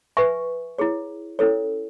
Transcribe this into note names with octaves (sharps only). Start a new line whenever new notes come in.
B4 E5 G#5 C#6
E4 G#4 C#5
C#4 E4 A4 C#5